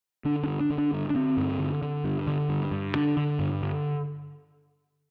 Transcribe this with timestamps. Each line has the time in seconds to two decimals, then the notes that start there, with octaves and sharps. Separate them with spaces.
0.25 D3 D4
0.44 D4
0.47 G2
0.60 D4
0.70 D3
0.78 D4
0.93 G2
1.10 D4
1.15 D3 C4
1.37 G2
1.59 D3
1.82 D3
2.04 G2
2.27 D3
2.49 G2
2.71 G2
2.94 D3 D4
3.17 D3
3.39 G2
3.62 D3